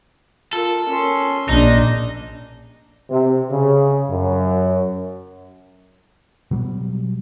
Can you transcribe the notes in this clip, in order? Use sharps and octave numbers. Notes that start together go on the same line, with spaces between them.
F4 A4 A#4
C#4 C6
A#1 D4 D#4
C3
C#3
F#2
B2 F#3 G3